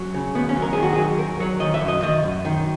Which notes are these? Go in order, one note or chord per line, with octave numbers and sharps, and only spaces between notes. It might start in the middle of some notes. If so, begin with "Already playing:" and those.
Already playing: F#3 C#4
C#3
D#2 B3
C#4
F#3
A#4
D#3 G#4
F#4
F#3 G#4
D#2 A#4
F#3 C#5
D#3 D#5
E5
F#2
D#5
D#3 D#5
F#2
D#3